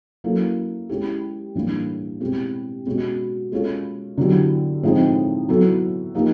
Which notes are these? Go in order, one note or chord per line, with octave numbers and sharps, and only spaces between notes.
F#3 A#3 C#4 E4 A4
G#3 C#4 E4 G4
A2 E3 G3 A#3 D4
B2 G#3 C4 E4 G4
B2 G#3 C#4 F#4
G#3 C#4 F4 A4
D3 F#3 B3 E4 G4
A2 F3 G#3 C4 D#4
F#3 B3 E4 A4
F3 A#3 D#4 G4